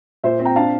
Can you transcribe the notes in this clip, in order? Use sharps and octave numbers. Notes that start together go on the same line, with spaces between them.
A#2 C5 E5
C4
G5 A#5
D4 F5 A5